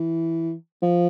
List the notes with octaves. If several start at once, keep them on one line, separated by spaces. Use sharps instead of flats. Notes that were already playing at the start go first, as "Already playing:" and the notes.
Already playing: E3
F3